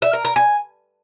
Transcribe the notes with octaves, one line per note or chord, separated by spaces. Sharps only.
E5
A#4
A#4
G#5